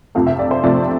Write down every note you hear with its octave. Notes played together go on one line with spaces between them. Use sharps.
F2 C3 F3 A3 F5
E5
D5
C5
F2 C3 F3 A3 D5